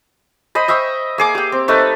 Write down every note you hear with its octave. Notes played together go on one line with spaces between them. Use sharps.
C5 D#5 B5
D#5 E5 G5 C#6
A#3 G#4 D6
G4 G5
C4
A3 D#4 A4 B4